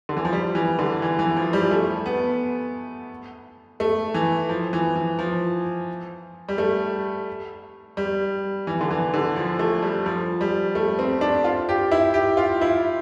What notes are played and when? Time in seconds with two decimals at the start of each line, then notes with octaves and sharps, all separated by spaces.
0.09 D3
0.17 E3
0.25 F3
0.33 G3
0.55 E3
0.79 D3
1.02 E3
1.19 E3
1.36 F3
1.53 G3
1.71 A3
2.06 B3
3.80 A3
4.14 E3
4.49 F3
4.73 E3
4.96 E3
5.19 F3
6.49 G3
6.58 A3
7.97 G3
8.67 E3
8.81 D3
8.90 E3
9.14 D3
9.36 F3
9.59 A3
9.82 G3
10.06 F3
10.41 G3
10.75 A3
10.99 C4
11.21 D4
11.44 F4
11.69 G4
11.92 E4
12.14 G4
12.37 F4
12.61 E4